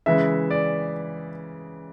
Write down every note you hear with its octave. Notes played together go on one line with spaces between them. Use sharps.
C#3 E3 G#3 E5
D5